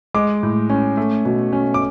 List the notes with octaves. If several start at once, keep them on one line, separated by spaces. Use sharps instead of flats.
G#3 D6
A2
C#4
A3
B2
C#4
D6